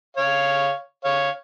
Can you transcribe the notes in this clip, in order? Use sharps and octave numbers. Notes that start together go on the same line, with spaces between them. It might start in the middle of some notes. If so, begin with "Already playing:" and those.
C#5 F5
C#5 F5